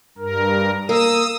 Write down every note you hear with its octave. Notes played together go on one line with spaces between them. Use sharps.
G2 A#4
A#3 D#6 E6